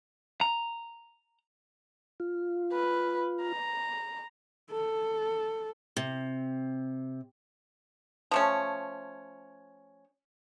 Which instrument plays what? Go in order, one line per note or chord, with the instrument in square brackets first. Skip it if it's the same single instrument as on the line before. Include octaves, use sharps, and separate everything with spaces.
[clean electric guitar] A#5
[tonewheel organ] F4
[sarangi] B4
A#5
[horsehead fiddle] A4
[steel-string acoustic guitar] C3
[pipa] F3 A3 C#4